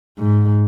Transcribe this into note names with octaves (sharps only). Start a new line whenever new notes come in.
G#2